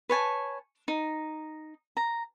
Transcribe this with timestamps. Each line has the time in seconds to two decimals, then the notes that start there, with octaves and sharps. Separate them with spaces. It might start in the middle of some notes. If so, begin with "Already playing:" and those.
0.09 B4 C#5 G#5 A5
0.88 D#4
1.97 A#5